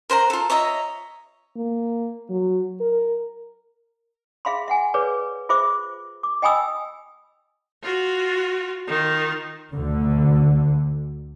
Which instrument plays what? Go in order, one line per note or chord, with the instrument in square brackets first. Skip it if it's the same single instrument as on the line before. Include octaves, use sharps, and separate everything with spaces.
[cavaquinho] A#4 C5 F#5 A#5
F4 A4
C#5 D#5 E5 A#5
[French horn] A#3
F#3
A#4
[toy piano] G#4 E5 F5 B5 C6
E5 F#5 G#5
G#4 B4 C#5 D5
F4 G#4 C5 E5 D6
D6
D#5 G5 G#5 B5 D#6 E6
[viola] F4 F#4
D#3 F4
[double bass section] D2 D3